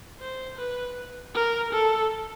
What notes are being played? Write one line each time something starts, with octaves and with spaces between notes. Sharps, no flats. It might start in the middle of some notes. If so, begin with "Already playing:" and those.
C5
B4
A#4
A4